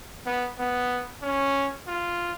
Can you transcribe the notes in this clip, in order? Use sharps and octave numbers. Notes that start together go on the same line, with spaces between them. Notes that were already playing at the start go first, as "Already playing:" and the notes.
B3
B3
C#4
F4